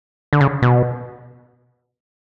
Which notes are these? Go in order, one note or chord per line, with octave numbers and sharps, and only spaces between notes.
D3
C#3
B2